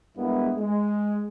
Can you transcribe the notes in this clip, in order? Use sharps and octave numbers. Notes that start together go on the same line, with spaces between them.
G2 G#3 A#3 B3 E4
G#3